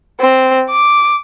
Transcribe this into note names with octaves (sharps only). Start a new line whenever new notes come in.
C4
D6